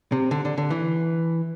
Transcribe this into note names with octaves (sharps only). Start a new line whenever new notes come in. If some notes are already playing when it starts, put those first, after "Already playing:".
C3
D3
D3
D3
E3